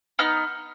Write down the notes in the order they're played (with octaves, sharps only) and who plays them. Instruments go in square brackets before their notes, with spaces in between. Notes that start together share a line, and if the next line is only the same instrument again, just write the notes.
[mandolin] B3 D#4 F6